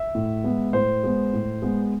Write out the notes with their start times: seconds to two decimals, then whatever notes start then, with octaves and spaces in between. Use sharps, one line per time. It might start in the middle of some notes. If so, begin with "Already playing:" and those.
Already playing: E5
0.15 A2
0.44 G#3 B3
0.73 A2 C5
1.04 G#3 B3
1.33 A2
1.62 G#3 B3